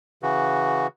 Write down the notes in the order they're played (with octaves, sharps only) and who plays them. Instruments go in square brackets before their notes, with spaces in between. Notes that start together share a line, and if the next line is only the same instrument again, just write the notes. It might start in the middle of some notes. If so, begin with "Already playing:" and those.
[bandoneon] C#3 E3 F#4